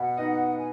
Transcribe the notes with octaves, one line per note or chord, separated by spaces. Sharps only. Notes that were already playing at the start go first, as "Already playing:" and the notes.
Already playing: B2 B3 F#5
B3 D#4 B4 D#5
G#5